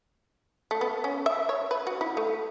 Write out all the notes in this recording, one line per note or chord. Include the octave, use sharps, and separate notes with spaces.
A3
B3
C#4
E5
C#5
B4
F#4
E4
A3